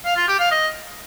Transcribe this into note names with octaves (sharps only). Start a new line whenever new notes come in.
F5
F4
G4
F5
D#5